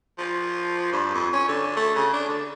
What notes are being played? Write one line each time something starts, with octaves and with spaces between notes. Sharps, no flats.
F3
G2
F2
C#4
D3
A3
C#3
D4
D3